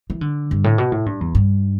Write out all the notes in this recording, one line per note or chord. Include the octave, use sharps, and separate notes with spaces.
E3
D3
G2
A2
B2
A2
G2
E2
G2